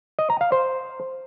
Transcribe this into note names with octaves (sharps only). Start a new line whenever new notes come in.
D#5
A#5
F5
C5